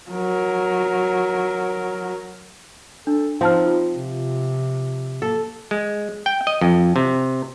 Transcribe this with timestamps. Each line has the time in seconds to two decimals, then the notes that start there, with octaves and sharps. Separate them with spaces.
0.11 F#3 A#4
3.07 D4 A4
3.41 F3 C4 D#4 F5 A5 F6
3.66 F4
3.94 C3
5.22 A#3 A4
5.71 G#3
6.26 G5
6.47 D#5
6.61 F2
6.96 C3